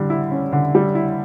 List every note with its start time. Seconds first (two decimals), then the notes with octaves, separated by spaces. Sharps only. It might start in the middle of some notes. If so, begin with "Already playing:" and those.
Already playing: D3 G3
0.10 E4
0.32 C#4
0.52 D3
0.75 G3
0.95 E4